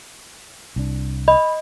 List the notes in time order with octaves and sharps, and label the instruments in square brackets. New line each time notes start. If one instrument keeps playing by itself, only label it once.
[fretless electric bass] C2 D4
[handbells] D#5 [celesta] B5